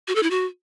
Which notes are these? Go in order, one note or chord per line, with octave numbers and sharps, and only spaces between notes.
F#4
A4
E4
F#4